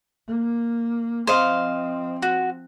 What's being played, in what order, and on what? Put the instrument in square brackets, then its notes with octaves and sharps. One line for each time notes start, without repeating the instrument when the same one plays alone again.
[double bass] A#3
[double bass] F3 C4 [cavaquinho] C5 D#5 F5
[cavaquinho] F#4